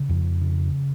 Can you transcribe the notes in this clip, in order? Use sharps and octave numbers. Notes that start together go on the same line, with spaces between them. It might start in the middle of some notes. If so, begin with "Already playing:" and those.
Already playing: C#3
F2
C#3